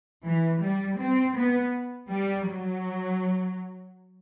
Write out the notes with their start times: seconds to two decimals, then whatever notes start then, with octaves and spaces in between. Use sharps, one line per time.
0.24 E3
0.62 G3
0.99 C4
1.37 B3
2.11 G3
2.49 F#3